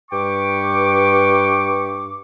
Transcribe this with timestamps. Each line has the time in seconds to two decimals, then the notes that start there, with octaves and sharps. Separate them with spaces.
0.11 G2 B4 G5 C#6 D6